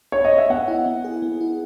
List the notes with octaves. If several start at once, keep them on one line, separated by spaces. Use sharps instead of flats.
C#5
D#5
E5
B3 F#5
E4
B3
G#4
B3
E4